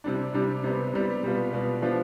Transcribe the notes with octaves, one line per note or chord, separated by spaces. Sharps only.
C3 G3 D4
C3 G3 D4
C3 G3 B3
C3 G3 B3
B2 G3 B3 F4
B2 G3 B3 F4
F3 B3 D4 F4